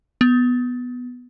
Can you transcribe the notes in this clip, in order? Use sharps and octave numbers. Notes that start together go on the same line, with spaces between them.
B3